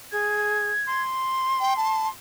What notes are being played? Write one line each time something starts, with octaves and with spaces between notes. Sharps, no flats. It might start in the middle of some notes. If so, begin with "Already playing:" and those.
G#4 G#6
C6
G5
A5